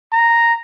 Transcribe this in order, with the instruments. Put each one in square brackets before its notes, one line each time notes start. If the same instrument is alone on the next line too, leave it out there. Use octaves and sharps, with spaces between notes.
[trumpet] A#5